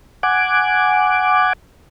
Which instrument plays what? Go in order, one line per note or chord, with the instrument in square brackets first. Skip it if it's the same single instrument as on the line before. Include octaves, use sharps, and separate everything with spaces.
[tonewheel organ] F#5 G#5 D6